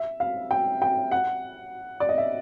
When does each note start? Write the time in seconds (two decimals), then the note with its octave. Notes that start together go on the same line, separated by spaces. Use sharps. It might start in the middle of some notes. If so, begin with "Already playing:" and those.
Already playing: E5
0.20 F5
0.51 G5
0.82 G5
1.11 F#5
2.00 D5
2.09 D#5
2.18 E5